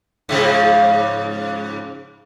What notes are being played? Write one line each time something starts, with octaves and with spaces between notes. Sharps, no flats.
G#2 C#3 F3